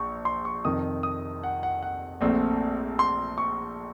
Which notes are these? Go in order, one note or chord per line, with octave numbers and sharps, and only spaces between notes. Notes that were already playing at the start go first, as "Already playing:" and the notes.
Already playing: A#1 C#6
C6
C#6
F2 C3 D#3 D#6
D#6
F#5
F#5
F#5
A#1 A#2 A3 C4
C6
C#6